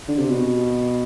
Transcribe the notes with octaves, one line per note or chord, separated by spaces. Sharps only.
D3
C3
B2